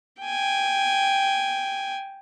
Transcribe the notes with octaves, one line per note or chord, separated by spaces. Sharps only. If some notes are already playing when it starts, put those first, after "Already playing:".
G5 G#5